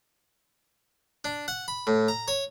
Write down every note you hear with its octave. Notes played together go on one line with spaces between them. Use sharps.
D4
F#5
B5
A2
A#5
C#5